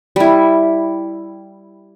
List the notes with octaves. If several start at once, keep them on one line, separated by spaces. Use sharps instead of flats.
G3 E4